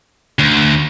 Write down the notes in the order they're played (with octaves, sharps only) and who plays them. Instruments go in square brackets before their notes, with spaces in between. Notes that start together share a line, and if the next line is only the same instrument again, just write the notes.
[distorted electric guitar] D2